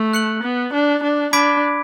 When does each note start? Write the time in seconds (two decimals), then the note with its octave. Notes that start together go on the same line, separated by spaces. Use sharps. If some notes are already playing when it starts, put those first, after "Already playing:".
Already playing: A3
0.13 F#6 C#7 F#7
0.43 B3
0.73 D4
1.03 D4
1.33 D4 B5 D6 G#6 B6 D7